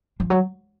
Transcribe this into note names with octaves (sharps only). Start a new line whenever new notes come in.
F3
F#3